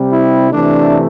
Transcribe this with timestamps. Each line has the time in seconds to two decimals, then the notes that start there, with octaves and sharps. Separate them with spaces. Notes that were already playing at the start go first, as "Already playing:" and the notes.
Already playing: C3 G3 C4
0.10 E4
0.52 C3 E3 A3 D4